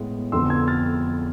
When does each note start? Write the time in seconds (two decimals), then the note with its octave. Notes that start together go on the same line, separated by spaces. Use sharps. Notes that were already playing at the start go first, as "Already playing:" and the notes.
Already playing: A2 G#3 B3
0.32 F2 D3 F3 B3 C6 E6
0.50 E6 G#6
0.67 F6 A6